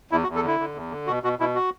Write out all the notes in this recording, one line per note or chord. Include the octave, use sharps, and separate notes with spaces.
E2 E4
F#4
E2
A4
D3 E4
D3
E2
D3
B2 F#4
B2 F#4
B2 E4
F#4